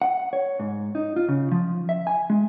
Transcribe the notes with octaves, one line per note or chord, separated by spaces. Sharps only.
F#5
C#5
G#2
D#4
F4
C#3
F3
E5
G#5
G#3